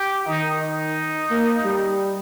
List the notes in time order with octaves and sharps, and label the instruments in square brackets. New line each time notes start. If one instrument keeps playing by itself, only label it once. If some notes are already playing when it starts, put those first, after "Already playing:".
Already playing: [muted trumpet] G4
[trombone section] D#3 [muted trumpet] D#4
[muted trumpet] D#4
[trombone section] A#3
G3